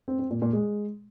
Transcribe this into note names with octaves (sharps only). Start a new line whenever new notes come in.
C4
C4
A#2
A#2
G#3